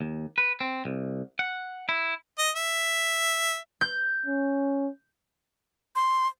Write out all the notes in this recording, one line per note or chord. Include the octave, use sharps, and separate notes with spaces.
D#2
B4
C4
C2
F#5
E4
D#5
E5
G6
C#4
C6